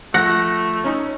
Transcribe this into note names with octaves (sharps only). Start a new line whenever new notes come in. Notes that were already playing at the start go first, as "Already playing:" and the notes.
F3 A3 F#5 A#6
C#4 D#4